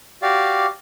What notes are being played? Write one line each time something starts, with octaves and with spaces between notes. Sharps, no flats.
F#4 G4 D5 F5